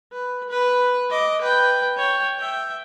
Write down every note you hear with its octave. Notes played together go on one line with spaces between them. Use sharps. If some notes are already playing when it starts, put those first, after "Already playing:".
B4
B4
D#5 D6
B4 G5
C#5 G5
E5 G5